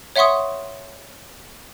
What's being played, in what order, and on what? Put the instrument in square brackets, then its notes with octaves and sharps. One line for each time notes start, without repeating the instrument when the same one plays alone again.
[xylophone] C#5 E5 F#5 C6 C#6 D#6